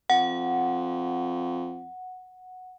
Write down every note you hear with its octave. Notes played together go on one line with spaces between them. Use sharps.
F2 F#5